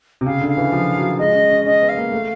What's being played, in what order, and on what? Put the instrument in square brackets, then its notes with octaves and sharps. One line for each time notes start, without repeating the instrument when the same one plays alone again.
[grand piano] C3
[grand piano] C#3 [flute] F5
[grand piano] D3
[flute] F5
[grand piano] E3
F3
F#3
[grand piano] G#3 [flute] D#5
[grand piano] C#4
C#4
[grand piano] C#4 [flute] D#5
[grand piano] B3
[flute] F5
[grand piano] A#3
A3